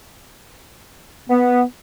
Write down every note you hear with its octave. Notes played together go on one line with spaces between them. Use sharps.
B3